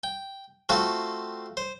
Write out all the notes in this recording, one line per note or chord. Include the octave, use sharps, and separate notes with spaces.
G5
A3 C4 F4 F#4 A4
C5